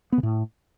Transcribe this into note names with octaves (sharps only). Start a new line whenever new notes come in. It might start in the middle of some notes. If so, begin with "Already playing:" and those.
B3
C#3
A2